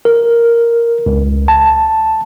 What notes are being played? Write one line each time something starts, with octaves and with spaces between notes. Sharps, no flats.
A#4
C#2
A5